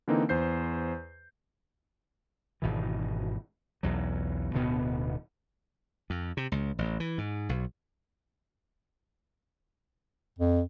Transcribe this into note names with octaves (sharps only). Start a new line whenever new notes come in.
D3 E3 A#3 C4 D#4
E2 C5 G6 C7
G#1 B2 E3
B1 E2 F#3
D1 D2 B2 B3
F2
C3
C#2
A1
E3
G#2
B1
F2